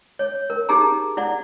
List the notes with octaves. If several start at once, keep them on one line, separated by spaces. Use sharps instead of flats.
C#5
A#4
D#4 G4 G#4 A#5
E4 D5 F#5